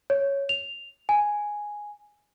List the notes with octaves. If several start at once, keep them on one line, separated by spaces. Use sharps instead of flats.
C#5
F7
G#5